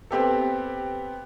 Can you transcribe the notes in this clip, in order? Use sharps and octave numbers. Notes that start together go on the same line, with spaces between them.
B3 C4 G4 A4